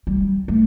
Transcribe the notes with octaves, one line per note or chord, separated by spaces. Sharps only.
G3
A3